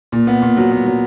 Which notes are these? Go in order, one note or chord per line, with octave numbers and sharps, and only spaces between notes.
A#2
B3
A#2
F#3
B3
F#3